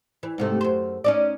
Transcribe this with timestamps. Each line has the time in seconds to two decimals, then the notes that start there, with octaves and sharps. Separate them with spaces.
0.23 E3
0.38 G#2 C3 A3
0.61 F#2 C5
1.04 C#4 D#4 D5